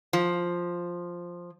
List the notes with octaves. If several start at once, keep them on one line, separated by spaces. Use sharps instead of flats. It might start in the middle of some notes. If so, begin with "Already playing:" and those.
F3